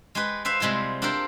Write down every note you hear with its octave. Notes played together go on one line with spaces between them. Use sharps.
G#3 G4 B4
B4 C5 E5 F5
C3 G3 G#3 E4 F4
D4 F4 G4 A4 A#4 C5